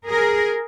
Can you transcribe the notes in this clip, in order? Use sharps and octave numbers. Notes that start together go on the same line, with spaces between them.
G#4 A#4